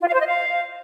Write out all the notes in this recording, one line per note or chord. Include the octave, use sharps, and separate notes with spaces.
F4
F5
C5
D#5
F5